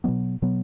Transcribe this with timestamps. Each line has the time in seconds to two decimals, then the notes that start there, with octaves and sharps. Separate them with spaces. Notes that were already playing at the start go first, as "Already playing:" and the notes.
0.04 B2 F#3 B3
0.42 B2 F#3 B3